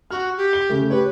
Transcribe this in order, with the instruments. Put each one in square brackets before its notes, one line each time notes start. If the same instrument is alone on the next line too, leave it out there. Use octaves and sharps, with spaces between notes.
[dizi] F#4 [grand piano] F6
[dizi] G4
[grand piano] G7
C#3 A3
[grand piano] G4 C#5 [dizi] B4